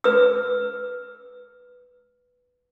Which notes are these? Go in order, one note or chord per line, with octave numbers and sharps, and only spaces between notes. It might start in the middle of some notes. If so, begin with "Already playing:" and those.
B4 E6